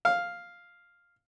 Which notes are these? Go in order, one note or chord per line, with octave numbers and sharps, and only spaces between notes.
F5